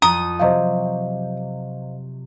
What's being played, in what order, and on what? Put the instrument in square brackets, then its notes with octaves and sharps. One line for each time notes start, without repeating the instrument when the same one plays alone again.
[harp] F2 [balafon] A#5 [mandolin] D#6
[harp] C3 F#3 C4 [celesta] C5 D#5 F5